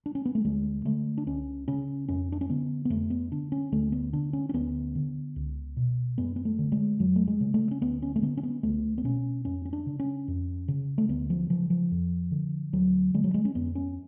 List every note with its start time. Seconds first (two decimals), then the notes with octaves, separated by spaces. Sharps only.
0.06 D4
0.15 C#4
0.25 B3
0.35 A3
0.45 D2 G#3
0.85 D3 A3
1.18 D4
1.26 C#2 C#4
1.68 C#3 C#4
2.08 F2 C#4
2.32 D4
2.41 C#4
2.50 D3 B3
2.85 B3
2.90 F2 A3
3.10 B3
3.32 D3 D4
3.52 C#4
3.72 D2 A3
3.92 B3
4.13 D3 D4
4.33 C#4
4.49 C#4
4.54 D2 B3
4.95 D3
5.36 C#2
5.77 B2
6.18 F#2 B3
6.36 B3
6.45 A3
6.59 D3
6.72 G#3
7.00 F2 F#3
7.16 A3
7.28 G#3
7.41 C#3
7.54 A3
7.71 C#4
7.81 D2 B3
8.02 C#4
8.16 A3
8.22 D3 B3
8.37 C#4
8.43 B3
8.63 C#2 A3
8.98 B3
9.04 B2 C#4
9.45 F2 C#4
9.65 C#4
9.73 D4
9.86 C#3
9.99 C#4
10.28 F2
10.68 C#3
10.98 A3
11.09 D2 B3
11.30 F3
11.50 C#3 F3
11.70 F3
11.91 F2
12.31 D3
12.73 D2 F#3
13.14 D3 G#3
13.24 F#3
13.34 G#3
13.45 C#4
13.55 F2 B3
13.75 C#4